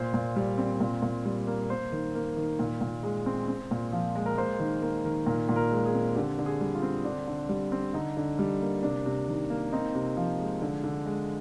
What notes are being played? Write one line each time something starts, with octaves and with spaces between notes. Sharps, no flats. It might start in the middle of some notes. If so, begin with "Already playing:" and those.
Already playing: A#2 C5
A#2
G3
C4
A#2
A#2
G3
A#3
A#3 C5
D#3
A#3
D#3
A#2
A#2
G#3
C4
C4
A#2
F3
G#3
A#4
A#3 C5
D#3
A#3
D#3
A#2 A#4
A#2
A#4
G#3
G#4
C4
D3 G4
D3
G#4
G3
F4
C4
D3 D4
D3
G3
C4
D3 D#4
D3
G3
A#3
C3 D4
C3
D#3
A#3
C4 D#4
C3
F3
G#3
D3
D3
G#3